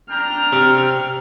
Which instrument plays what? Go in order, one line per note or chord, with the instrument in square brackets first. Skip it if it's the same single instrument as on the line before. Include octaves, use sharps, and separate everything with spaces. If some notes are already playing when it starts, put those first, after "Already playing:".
[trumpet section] D4 G5 A#5 [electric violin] F6
[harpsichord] C3